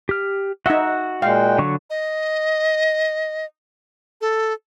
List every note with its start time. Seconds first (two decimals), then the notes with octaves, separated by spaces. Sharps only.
0.09 G4 F6
0.66 D#4 F#4 E5 F#5 E6
1.22 A#2 G#3 F5 G5
1.58 D3 F#3 C#6
1.90 D#5
4.21 A4